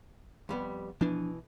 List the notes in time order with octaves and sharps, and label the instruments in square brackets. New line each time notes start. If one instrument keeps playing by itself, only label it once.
[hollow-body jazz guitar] F2 G3 B3
[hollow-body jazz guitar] B2 E3 [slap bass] F3 D4